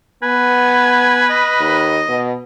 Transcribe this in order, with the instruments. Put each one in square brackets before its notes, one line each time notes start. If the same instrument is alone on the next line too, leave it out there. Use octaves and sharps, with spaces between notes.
[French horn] B3 [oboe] B4 [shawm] G#5
[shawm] D#5
[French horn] D#2
B2